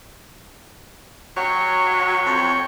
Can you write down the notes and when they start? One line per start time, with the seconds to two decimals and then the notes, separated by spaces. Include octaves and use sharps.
1.37 F#3 C#5 G5 C#6
2.25 F2